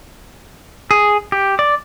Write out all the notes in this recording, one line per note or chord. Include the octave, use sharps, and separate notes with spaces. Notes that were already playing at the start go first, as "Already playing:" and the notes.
G#4
G4
D5